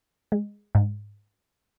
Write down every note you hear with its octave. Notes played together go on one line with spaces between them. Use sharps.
G#3
G#2